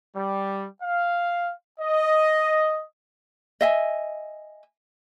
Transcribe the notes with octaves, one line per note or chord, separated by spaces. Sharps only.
G3
F5
D#5
D#5 E5 G#5